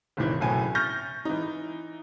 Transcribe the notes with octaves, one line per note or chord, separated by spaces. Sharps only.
G1 C2 A#2 D#3 E3
F#1 B1 A2 G#5
C#6 F6 G6 A6 A#6
E3 D#4